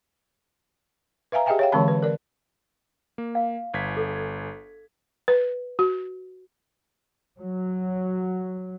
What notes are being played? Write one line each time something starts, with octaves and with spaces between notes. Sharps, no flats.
B4 E5 F5 G#5 A#5
G4 G#4 D#5 E5 G5 G#5
C#5 F5 G5
D3 E3 G#3 C4 A5 B5
B4
A#4 D5
A#3
F5
G1 G#6 B6
A4
B4
F#4
F#3